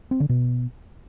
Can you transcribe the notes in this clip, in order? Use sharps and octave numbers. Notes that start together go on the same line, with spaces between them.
C4
D3
B2